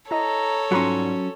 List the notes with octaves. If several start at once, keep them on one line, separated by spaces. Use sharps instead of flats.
E4 A4 C#5 D#5 A#5
G#2 F#3 G3 C#4 F4 A#5 C6